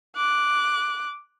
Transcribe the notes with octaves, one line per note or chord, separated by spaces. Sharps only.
D6 F#6